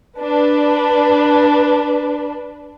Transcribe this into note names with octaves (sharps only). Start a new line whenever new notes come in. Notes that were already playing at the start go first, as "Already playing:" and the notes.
D4 B4